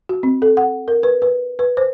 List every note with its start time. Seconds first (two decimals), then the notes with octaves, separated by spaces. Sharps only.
0.09 F#4
0.23 C4
0.42 A4
0.57 F#5
0.88 A#4
1.03 B4
1.22 B4
1.59 B4
1.77 C5